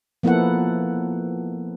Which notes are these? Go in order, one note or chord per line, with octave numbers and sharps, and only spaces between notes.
F3 A#3 B3 E4 A4 F#5